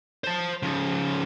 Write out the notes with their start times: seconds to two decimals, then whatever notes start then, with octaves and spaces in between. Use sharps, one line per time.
0.24 C5 A5
0.63 C#3 F3